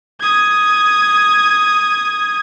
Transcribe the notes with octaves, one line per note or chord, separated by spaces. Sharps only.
D#6 G#6